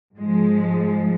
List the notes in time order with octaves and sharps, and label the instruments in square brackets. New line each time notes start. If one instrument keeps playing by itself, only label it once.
[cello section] G#2 F3 G#3